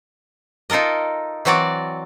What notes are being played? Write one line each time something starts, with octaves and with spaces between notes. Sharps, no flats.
D#4 F4 A4 A#4 D#5
E3 F#3 C4 F#4 D5